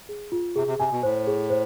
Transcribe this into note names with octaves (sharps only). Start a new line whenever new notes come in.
G#4
F4
C3 G#4
C3
C3 G#5
B2
A2 C5
G#4
C5